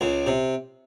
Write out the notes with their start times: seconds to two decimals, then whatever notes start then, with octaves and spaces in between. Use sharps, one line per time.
0.01 C#2 C#3
0.27 C3